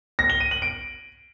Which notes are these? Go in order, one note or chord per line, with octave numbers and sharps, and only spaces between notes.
A#6
G7
D#7
F#7
D7